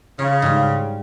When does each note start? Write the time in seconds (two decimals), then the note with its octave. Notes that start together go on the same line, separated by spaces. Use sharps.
0.19 C#3 F4
0.42 G#2 G3 F4